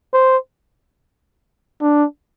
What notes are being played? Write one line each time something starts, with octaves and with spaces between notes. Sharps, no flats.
C5
D4